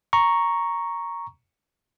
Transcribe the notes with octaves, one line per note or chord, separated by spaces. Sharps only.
A#5 C#6